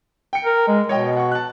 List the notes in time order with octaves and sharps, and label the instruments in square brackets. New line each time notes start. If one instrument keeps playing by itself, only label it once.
[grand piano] G5 C#7
[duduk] A#4
G#3
[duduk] B2 [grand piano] C#5 D#5 G5
[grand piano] F#5 C#6
A5 F#6